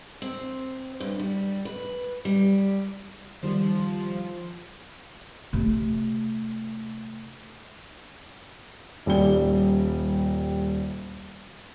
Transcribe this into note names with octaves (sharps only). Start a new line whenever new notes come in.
C4
G2
G3
B4
G3
D#3 F3 G3
C3 A3
D#1 G3 G7